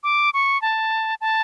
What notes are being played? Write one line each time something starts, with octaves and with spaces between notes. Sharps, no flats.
D6
C#6
A5
A5